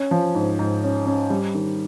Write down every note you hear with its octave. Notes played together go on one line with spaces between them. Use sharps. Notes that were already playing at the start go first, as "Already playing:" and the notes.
Already playing: C#4
F3
G#2
G#2
C#4
C#4
G3
D#3